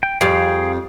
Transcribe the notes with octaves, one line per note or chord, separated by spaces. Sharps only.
G5
F2 G3 G#4 F5 G5